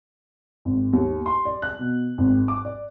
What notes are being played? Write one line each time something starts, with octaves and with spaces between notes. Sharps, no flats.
G#1
D#2
C6
D5
F#6
B2
G#1
D6
D5